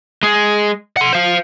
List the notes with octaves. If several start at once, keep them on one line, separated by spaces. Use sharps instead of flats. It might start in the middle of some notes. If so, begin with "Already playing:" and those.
G#3 G#4
F#5 C6
C5 F5